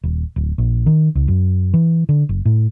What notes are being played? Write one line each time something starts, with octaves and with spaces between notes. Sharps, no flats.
D#1
D1
A#1
D#3
C#2
F#2
E3
D3
F#1
A2